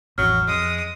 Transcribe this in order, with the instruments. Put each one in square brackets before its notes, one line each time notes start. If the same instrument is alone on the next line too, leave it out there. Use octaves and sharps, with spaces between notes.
[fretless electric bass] A1 F2 [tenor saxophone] F#3 [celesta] F6
[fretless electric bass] F2 [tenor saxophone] G#3 [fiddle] D#6